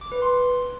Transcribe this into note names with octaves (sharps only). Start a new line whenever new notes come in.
D6
B4
C6